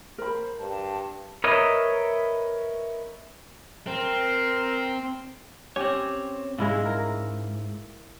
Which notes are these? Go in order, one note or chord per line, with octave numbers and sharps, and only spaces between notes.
A#4 C5 B5
G2 A5
A#4 B4 C#5 D#5 E5
C4 A#4
C4 C#4 G4 C#5
G#2 G#3 E4 F4
A#4